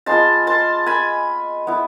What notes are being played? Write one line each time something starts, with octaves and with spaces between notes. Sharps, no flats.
G#3 B3 F4 A5 C6
A5 C6
G#5 B5
B3 E4